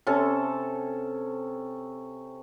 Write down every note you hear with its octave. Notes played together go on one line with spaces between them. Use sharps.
C3 C#4 A4 A5